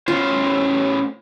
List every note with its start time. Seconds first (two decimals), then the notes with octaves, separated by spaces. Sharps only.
0.08 A2 C#4 F4 C5